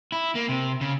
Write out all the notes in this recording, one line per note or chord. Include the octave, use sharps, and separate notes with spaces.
E4
A#3
C3
C#3